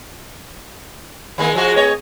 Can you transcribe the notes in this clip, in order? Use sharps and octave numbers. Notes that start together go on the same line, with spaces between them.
D#3 G#3 A#3
F3 G#3 F#4
A3 C#5 D#5